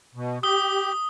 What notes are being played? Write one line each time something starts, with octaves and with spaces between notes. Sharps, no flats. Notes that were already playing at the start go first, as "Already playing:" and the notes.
B2
G4 D#6 G7